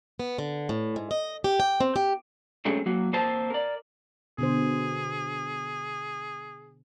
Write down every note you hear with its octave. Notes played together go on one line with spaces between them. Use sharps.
B3
D3
A2
G#2
D#5
G4
G5
C4
G4
F#3 G#3 A3 C4 C#4 G#4
F#3 A#3 F#4
A#3 C4 C5 A5
A#4 D5
B2 D3 G#4 C5